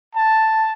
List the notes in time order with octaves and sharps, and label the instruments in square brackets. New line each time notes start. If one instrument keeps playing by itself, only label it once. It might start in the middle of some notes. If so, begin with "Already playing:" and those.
[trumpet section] A5